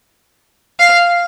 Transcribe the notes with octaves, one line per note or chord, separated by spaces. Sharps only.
F5